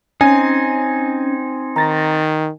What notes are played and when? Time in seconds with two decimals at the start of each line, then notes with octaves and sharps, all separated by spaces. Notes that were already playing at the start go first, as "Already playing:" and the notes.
0.21 C4 C#4 D#4 G#5
1.76 D#3 A#5 A6 A#6